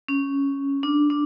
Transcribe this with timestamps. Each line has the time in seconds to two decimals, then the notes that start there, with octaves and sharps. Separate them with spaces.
0.08 C#4
0.83 D4
1.10 D4